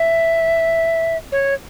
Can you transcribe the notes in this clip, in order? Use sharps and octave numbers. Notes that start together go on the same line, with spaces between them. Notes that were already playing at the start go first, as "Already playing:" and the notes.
Already playing: E5
C#5